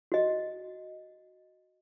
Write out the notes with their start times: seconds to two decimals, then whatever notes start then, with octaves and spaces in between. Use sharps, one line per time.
0.12 F#4 D#5